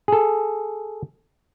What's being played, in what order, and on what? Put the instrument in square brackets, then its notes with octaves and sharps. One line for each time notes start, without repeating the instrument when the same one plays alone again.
[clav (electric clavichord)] G#4 A4